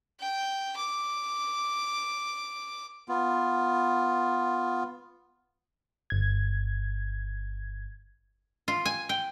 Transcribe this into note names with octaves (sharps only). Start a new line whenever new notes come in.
G5
D6
B3 F4
G1 G#6
F4
G#5
G5